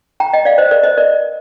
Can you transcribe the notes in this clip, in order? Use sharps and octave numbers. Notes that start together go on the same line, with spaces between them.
G5 A#5
D#5 G5
D5 F5
C5 D#5
A#4 D5
C5 D#5
A#4 D5